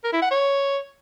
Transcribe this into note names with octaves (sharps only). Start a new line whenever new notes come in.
A#4
E4
F#5
C#5